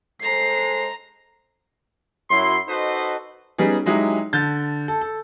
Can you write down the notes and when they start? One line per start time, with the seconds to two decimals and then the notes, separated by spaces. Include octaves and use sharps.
0.22 G#3 A4 C5 A#5 C7
2.30 F#2 F#3 E4 C6
2.67 D#4 F#4 A4 B4 C5 D#5
3.58 G3 B3 C#4 D#4 G#4
3.86 F#3 G#3 D#4 E4 G4
4.33 D3 G6 A6
4.88 A4
5.01 A4